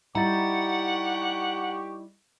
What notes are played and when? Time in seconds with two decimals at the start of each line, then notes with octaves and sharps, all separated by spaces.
0.15 G3 D#4 E4 G4 F#5 A#5 C#6 A6